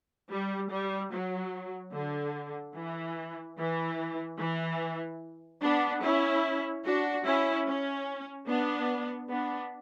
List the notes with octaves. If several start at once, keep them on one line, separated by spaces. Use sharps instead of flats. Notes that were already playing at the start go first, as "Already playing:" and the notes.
G3
G3
F#3
D3
E3
E3
E3
B3 D4
C#4 E4
D4 F#4
C#4 E4
C#4
B3 D4
B3 D4